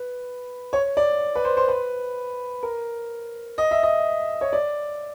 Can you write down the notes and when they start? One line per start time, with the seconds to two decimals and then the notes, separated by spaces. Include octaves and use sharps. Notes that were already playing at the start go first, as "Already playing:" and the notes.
Already playing: B4
0.73 C#5
0.97 D5
1.35 B4
1.45 C5
1.57 C5
1.68 B4
2.63 A#4
3.58 D#5
3.71 E5
3.83 D#5
4.41 C#5
4.53 D5